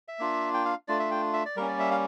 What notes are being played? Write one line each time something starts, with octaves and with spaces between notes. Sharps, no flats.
E5
A#3 D4 F4
G5
F5
A3 D4 F4 D5
E5
G5
E5
D5
G3 A#3 C#4 A#4
D5
E5
F5